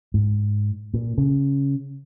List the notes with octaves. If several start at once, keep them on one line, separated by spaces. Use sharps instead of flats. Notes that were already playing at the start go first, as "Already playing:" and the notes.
G#2
A#2
C#3